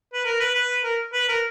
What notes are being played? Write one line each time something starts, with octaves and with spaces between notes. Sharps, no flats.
B4
A#4
B4
B4
A#4
B4
A#4